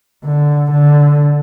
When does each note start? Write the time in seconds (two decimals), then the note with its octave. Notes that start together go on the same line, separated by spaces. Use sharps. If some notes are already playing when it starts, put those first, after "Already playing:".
0.24 D3
0.72 D3